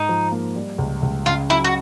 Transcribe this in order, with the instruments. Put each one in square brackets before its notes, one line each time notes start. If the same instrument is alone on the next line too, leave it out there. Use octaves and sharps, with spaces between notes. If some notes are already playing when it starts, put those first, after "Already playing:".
Already playing: [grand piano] G#2 [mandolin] D#4
[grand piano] F3
A#3
G3
C#2
C#2
[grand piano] C#3 [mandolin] F4
[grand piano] F#3 [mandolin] E4
[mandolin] F#4